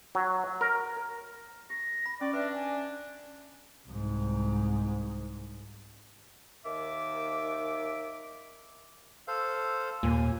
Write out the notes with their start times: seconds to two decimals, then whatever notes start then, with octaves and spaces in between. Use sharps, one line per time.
0.15 F#3
0.61 A#4
1.70 G4 A#6
2.06 B5
2.21 C#4 D5 C#6
2.33 D4 B4 E5 C6
2.54 G#5
3.88 C2 G#2
6.66 D#2 D#3 E5 D6
9.28 A4 C5 F5
10.03 D#2 A#2 G#5